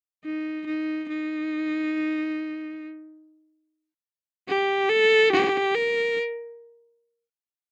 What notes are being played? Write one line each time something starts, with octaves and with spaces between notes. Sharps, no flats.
D#4
D#4
D#4
G4
A4
G4
A#4